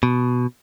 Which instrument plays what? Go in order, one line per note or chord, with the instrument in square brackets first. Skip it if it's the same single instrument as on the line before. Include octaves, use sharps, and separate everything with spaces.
[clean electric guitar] B2